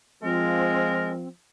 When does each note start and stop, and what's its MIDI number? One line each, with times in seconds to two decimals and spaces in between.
0.23 1.27 53
0.23 1.14 56
0.23 1.28 60
0.23 1.13 70